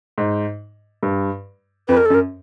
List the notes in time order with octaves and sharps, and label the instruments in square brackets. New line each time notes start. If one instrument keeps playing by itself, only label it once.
[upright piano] G#2
G2
[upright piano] F2 [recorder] B4
[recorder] A#4
A4
[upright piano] F#2
[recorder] A#4